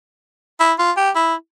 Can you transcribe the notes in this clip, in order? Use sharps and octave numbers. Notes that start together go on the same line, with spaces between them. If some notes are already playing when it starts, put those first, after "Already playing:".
E4
F4
G4
E4